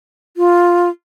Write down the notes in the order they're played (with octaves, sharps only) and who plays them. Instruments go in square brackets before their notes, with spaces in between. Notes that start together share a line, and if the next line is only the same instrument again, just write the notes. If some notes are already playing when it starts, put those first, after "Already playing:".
[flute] F4